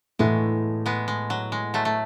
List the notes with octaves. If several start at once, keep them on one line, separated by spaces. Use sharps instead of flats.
A2 E3 G#3 A3 B3 E4
G#3 B3
G#3
F#3
G#3
F#3 A3
A3